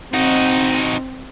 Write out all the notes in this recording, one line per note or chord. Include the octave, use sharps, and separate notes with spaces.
C4 D#4 F#4